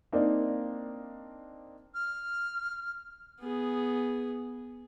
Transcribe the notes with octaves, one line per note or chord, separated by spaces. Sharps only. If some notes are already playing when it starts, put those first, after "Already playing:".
A#3 C4 D4 D#4 D5
F6
B3 G#4